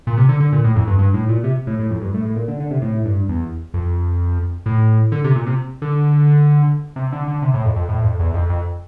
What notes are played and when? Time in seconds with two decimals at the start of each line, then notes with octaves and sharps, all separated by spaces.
0.07 A#2
0.18 C3
0.29 D3
0.40 D3
0.52 A#2
0.64 A2
0.76 F2
0.87 G2
0.99 G2
1.14 A2
1.29 A#2
1.44 C3
1.67 A2
1.80 A2
1.91 F2
2.02 G2
2.14 A2
2.25 A2
2.36 A#2
2.48 D3
2.60 D3
2.71 C3
2.82 A2
3.05 G2
3.29 E2
3.74 F2
4.66 A2
5.12 D3
5.24 C3
5.36 A#2
5.46 C3
5.82 D3
6.96 C3
7.12 D3
7.28 D3
7.42 C3
7.54 A2
7.65 F2
7.76 F2
7.89 A2
8.03 F2
8.20 E2
8.34 F2
8.50 F2